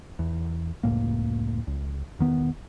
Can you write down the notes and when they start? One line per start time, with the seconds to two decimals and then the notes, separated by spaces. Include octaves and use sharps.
0.19 E2
0.83 F1 C#2 A2 A#3
1.67 C#2
2.19 E1 D#3 B3